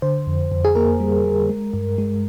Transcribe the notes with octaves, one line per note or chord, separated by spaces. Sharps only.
D3 C5
F2
F2
G#4
A#3 A#4
G3
G3
G#3
G2
G#3